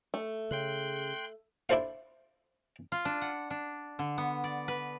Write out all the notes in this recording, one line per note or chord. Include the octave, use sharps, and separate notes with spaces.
A3
C#3 G5 C6 F#6
D4 E4 A4 C5 F5
F4
D4
F#5
D4
D3
B3
D5
B4